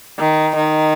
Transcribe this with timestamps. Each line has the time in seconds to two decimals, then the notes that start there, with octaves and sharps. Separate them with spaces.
0.19 D#3
0.55 D#3